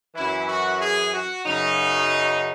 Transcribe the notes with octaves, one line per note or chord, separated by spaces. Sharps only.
F#2 E3 E4
F#4
G#4
F#4
F#2 C#3 F#3 D#4